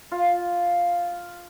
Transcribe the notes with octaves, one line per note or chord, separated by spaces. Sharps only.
F4